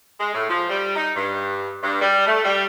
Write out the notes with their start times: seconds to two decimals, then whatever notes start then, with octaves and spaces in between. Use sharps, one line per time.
0.20 G#3
0.34 A2
0.49 F3
0.69 G3
0.96 D#4
1.15 G2
1.82 G2
2.01 G3
2.27 A3
2.44 G3